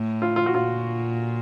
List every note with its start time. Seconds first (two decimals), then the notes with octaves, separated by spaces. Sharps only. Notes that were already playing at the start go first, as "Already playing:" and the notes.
Already playing: A2
0.22 F4
0.36 F4
0.46 F#4
0.51 A#2 F4